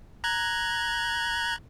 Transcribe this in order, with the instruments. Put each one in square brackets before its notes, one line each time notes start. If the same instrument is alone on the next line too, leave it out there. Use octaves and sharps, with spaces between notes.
[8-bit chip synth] A#5 F#6 G#6